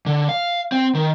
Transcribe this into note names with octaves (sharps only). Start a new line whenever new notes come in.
D3
F5
C4
D#3